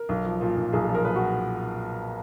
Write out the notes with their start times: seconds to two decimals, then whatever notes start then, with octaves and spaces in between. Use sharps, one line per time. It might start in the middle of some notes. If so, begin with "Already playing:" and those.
Already playing: A#4
0.09 B1
0.25 F3
0.41 A#2
0.57 B1
0.72 B1 G#4
0.84 G#4
0.89 F3
0.94 A#4
1.05 A#2 B4
1.16 F#4